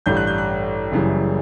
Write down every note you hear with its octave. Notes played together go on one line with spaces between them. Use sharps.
A1 G2 D3 G3 G6
F#6
G6
F#6
F#1 F#2 C#3 E3 G3